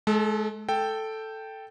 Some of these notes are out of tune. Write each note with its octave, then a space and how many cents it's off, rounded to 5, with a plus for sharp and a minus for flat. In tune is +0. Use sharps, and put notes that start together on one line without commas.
G#3 +35 A4 +0
A4 +0 G5 +0